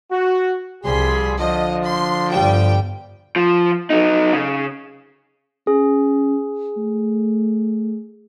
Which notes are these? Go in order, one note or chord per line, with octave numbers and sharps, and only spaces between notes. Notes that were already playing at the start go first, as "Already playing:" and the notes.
F#4
C2 F3 G3 G#4 C6 B6
D3 F3 D#5
C6
G1 G3 G5
F3
F#3 D#4
C#3
C#4 G#4
A3